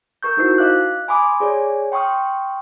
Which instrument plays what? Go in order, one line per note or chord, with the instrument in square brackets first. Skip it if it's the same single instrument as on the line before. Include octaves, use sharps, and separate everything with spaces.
[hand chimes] A#4 C#6 G6
D#4 E4 F#4 C5 E6 C7
D#5 F5 D6 F#6
G#5 B5 C6 D6 D#6
G#4 C#5 D5 G#5
G5 C6 C#6 D#6 F6